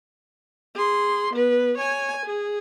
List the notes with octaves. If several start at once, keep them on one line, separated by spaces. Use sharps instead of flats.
G#4 C6
B3 B4
C#5 G#5
G#4